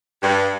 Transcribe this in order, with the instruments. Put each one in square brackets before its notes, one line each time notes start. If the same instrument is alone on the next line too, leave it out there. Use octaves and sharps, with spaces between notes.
[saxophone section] G2